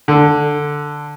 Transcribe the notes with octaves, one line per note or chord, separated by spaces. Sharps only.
D3